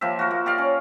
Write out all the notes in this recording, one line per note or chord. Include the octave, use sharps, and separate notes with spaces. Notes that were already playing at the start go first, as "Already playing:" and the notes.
F3 A#3 G4 E5
F#4 A#4
A#3
G4 D5 F5
C#4